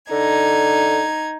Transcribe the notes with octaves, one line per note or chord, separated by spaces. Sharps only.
D3 D#4 G#6